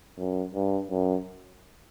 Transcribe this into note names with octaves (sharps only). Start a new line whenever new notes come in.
F#2
G2
F#2